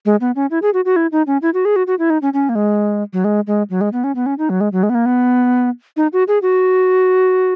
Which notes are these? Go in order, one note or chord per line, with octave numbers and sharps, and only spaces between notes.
G#3
B3
C#4
E4
G#4
F#4
F#4
E4
D#4
C#4
E4
F#4
G#4
F#4
F#4
E4
D#4
C#4
C#4
A#3
G#3
F#3
G#3
G#3
F#3
G#3
B3
C#4
B3
C#4
D#4
F#3
G#3
F#3
G#3
B3
A#3
B3
D#4
F#4
G#4
F#4